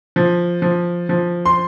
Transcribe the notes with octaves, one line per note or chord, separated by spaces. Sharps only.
F3
F3
F3
C6